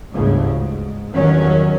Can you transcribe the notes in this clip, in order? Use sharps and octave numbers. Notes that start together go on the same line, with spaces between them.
G1 D2 G#2 C#3
G#2
E2 G2 D#3 F#3 C#4